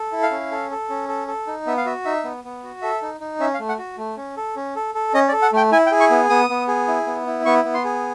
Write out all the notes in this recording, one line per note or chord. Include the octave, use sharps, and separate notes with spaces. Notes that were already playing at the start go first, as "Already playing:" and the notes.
Already playing: A4
E4
F5
C#4
A4
A4
C#4
A4
A4
D#4
B3 E5
F5
F#4 E5
D#4 E5
B3
B3
F#4
A4 E5
D#4
D#4
C#4 E5
F5
A3
F#5
F#4
A3
C#4
A4
C#4
A4
A4
C#4 D#5
D5
A4
F#5
A3 G5
E4 G#5
G5
G#4
C#6
B3
B3 D#6
B3
G#4
E4
B3
E4
B3 C#6
B3
C6
G#4